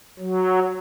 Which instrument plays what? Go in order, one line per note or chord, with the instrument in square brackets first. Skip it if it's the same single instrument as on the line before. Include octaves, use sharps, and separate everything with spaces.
[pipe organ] F#3